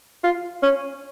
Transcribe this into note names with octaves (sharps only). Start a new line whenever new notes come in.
F4
C#4